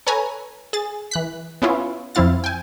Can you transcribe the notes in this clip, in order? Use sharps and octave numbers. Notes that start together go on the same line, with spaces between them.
A4 B4 C#5 G#5 A#5
G#4 A6
E3 F#6 B6
B3 C#4 E4 F4
F2 F3 C4 E4 F5 A6
G5 G#5